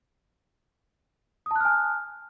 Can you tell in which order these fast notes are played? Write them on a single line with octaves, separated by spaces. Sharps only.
D#6 A5 F#6 F6 G#5